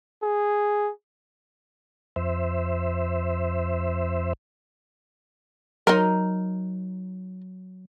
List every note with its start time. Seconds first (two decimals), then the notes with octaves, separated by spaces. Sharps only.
0.23 G#4
2.16 F2 C5 E5
5.87 F#3 D#4 A#4